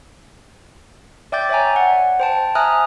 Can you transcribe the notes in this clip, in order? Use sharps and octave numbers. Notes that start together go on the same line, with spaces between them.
D5 E5 G5 D6 G6 A6
C#5 D5 E5 G5 G#5 A#5
F#5
C5 G5 A5
E5 G#5 A#5 D#6 F6 F#6